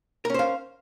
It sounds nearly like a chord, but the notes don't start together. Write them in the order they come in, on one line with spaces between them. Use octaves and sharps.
A#4 C#4 C5 F5